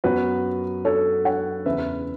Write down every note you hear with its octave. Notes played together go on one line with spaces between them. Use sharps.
F#2 F#3 B3 F#4 B4
A4 C#5
C#5 F#5
E2 C#3 E3 B4 E5